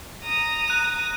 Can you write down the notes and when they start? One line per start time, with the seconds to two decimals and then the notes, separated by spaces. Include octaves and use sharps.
0.22 A#5 D#6
0.68 F#6 D#7